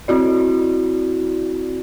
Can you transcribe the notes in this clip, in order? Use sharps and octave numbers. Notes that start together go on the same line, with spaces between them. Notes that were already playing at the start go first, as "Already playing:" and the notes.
C4 E4 F#4 D5